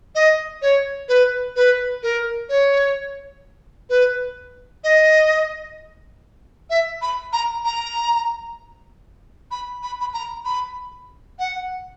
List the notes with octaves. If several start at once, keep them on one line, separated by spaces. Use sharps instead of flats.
D#5
C#5
B4
B4
A#4
C#5
B4
D#5
E5
B5
A#5
A#5
B5
B5
B5
A#5
B5
F#5